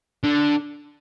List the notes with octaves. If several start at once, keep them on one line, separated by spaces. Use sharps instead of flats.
D3